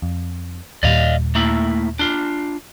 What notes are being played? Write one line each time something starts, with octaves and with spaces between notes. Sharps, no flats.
F2
D#2 A#2 G3 D5 D#5 F5
A3 A#3 E4
D4 F4